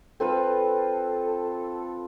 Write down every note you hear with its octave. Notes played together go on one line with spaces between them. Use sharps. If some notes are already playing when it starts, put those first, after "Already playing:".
C4 F4 A4 B4